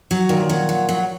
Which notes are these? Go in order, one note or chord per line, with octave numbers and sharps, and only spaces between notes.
F#3
A#2 D#3
F#3
F#3
F#3